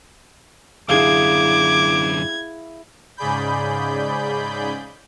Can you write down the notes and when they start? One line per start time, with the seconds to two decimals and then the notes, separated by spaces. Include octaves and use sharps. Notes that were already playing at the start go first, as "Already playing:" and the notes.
0.89 F#2 D3 E4 G#4 F5 D6 G#6
3.17 G#2 C#3 G#4 D5 B5 G6